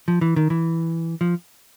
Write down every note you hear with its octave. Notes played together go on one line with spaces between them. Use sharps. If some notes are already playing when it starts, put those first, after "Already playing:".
F3
E3
D#3
E3
F3